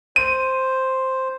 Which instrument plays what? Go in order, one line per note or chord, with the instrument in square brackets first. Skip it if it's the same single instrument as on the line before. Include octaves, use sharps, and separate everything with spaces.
[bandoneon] C5 [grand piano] D#7